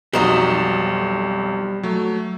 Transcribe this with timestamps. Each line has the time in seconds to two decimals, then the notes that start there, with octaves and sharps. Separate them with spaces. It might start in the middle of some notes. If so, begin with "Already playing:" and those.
0.13 B1 F2 G3 D#4 F#4 E7
1.83 F#3 A3